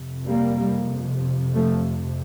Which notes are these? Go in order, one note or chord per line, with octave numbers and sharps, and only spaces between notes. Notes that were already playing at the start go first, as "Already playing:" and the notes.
Already playing: F2 C3
G3 A#3
F3 A3